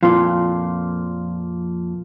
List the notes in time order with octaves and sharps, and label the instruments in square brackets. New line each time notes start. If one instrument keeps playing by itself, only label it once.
[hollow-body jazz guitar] F2 A#2 [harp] F4